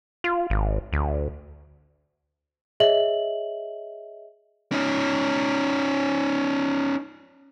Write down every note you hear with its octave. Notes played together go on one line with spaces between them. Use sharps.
F4
G#1
D2
G#4 C#5 D#5 E5 F#7
C#4 D#4